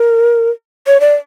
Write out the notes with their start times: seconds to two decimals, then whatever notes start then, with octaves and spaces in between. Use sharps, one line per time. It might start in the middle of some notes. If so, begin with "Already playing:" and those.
Already playing: A#4
0.87 C#5
1.00 D5